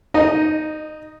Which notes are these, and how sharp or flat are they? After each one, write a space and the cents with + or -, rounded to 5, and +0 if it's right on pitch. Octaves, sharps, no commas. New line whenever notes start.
D#4 +0 D#5 -25